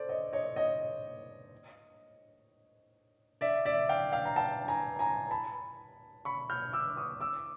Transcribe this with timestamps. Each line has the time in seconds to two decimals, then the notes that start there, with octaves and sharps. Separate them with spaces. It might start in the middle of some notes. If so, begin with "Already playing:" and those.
Already playing: A4 C5 D5
0.09 C#5 D#5
0.33 C#5 D#5
0.56 C#5 D#5
3.41 D5 E5
3.65 D5 E5
3.89 F5 G5
4.12 F5 G5
4.25 A#5
4.36 G5 A5
4.68 G#5 A#5
4.99 G#5 A#5
5.31 A5 B5
6.25 B5 C#6
6.50 F6 G6
6.73 D6 E6
6.97 C#6 D#6
7.21 D6 E6